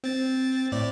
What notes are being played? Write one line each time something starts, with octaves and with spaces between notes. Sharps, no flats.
C4 A6
A2 D5